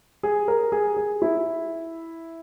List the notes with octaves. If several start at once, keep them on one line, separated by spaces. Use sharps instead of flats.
G#4
A#4
G#4
G#4
E4